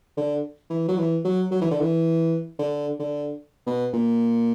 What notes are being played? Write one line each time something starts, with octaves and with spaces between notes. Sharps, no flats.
D3
E3
F#3
E3
F#3
F#3
E3
D3
E3
D3
D3
B2
A#2